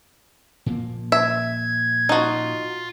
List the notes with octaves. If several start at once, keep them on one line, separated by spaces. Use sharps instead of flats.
A#2 F3 A#3
E5 G#6
D#4 F4 F#4